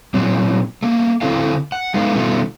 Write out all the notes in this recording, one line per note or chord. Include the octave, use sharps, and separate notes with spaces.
A#2 F#3 C4
A3 A#3
D3 C4 E4 A4 F5
F#5
G#3 A3 B3 D#4 F5
B2 D#3 G3 A3 D4 F4